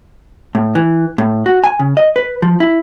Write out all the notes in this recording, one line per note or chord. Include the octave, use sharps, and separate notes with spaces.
A2
E3
A2
F#4
G#5
C#3
D#5
B4
F3
E4